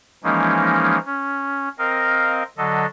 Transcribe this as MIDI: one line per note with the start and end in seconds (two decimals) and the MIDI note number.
0.24 0.98 52
0.24 0.98 53
0.24 0.98 56
0.24 0.98 58
0.24 0.98 61
0.24 0.98 63
1.06 1.69 61
1.78 2.43 60
1.78 2.43 70
1.78 2.43 75
1.78 2.43 77
2.57 2.86 50
2.57 2.86 54
2.57 2.86 69
2.57 2.86 75